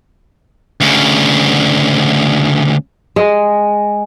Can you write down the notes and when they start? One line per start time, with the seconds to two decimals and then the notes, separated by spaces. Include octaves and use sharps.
0.80 D2 C#3
3.16 G#3